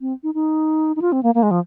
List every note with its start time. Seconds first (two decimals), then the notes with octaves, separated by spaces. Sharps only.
0.01 C4
0.23 D#4
0.34 D#4
0.96 D#4
1.02 F4
1.12 C4
1.23 A#3
1.35 A#3
1.43 G#3
1.51 F3